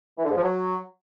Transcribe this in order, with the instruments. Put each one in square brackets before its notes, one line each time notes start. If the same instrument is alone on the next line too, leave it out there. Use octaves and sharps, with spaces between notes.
[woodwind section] E3
D3
G#2
F3
F#3